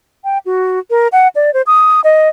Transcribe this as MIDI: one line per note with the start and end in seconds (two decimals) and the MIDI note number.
0.24 0.38 79
0.46 0.79 66
0.90 1.08 70
1.12 1.28 78
1.35 1.53 74
1.54 1.62 72
1.67 2.01 87
2.04 2.29 75